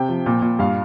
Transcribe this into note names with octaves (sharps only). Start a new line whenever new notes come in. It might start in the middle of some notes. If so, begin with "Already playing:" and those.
Already playing: C3 G5
F3
A#2
A#2
G2 F5